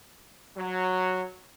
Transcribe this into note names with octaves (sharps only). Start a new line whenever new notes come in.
F#3